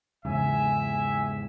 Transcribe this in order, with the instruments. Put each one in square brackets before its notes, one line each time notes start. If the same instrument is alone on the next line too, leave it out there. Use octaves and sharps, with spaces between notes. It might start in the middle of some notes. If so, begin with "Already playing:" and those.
[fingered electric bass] E2 G#2 [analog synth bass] C#3 [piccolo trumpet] E5 [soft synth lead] G#5